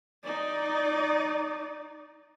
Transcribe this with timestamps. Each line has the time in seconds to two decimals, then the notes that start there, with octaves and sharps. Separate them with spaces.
0.24 D#4 D5